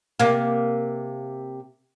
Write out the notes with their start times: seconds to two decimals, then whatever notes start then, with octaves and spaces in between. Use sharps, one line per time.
0.20 C3 A#3